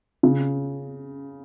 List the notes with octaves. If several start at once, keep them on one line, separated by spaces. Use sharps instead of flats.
C#3